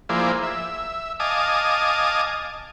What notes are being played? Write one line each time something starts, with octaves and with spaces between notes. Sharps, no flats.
F3 A#3 E4 G#4 C5 D5
E5
D#5 F5 G#5 A5 D6 D#6